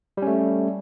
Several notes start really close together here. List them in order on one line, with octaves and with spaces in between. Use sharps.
G3 C#4 A3